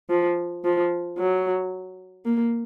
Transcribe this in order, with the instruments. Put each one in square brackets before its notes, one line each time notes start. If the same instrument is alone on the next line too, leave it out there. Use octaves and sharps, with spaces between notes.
[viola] F3
F3
F#3
A#3